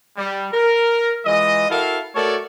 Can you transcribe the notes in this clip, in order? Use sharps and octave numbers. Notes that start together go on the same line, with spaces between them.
G3
A#4
E3 G#3 F4 D#5
E4 F#4 A4 A#4 F5
A3 F#4 A4 A#4 C#5 D5